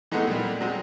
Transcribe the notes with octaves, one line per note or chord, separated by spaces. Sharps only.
E3 G#3 A3 B3 C4 D#4
A#2 G3
F#3 G#3 C4